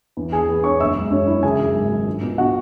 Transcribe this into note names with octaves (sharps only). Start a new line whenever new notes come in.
E2
E3 G#4 G#5
B3
B3 C#5 C#6
F#1 E5 E6
G#3
F#2 C#4 C#5
G#3 E4 E5
C#3 G#4 G#5
F#2
G#1
G#1
C#2
B2
B2 F#4 F#5